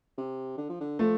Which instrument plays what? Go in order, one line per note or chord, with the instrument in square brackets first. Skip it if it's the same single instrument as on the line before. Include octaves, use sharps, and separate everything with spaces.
[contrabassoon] C3
D3
F3
D3
[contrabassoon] F3 [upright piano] A3